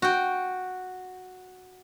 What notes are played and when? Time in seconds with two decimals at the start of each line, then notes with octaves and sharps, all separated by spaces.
0.02 F#4 G5